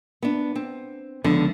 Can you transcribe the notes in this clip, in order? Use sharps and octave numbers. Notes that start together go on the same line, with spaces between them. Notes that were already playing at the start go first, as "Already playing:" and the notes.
B3 D4
C4
C#2 D3 F3 B3